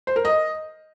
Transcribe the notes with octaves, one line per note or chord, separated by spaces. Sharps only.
C5
A#4
D#5